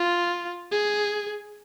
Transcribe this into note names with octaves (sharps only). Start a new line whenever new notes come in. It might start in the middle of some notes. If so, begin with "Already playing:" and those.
Already playing: F4
G#4